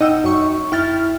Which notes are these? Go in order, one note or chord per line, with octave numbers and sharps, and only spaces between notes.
D#4 D#5 F#5 G5 E6
F#2 C#6
E4 G5 F6 A6